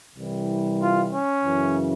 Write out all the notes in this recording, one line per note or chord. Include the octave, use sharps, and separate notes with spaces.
C2 C3 E3 G3
F4
C#4
F#2 C#3 E3